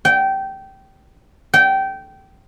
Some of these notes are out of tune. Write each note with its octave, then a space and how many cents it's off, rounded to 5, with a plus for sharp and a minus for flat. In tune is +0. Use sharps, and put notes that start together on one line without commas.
G5 -20
G5 -20